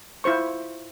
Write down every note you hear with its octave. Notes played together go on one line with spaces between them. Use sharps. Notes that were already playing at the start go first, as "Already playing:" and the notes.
E4 F4 C5 C#6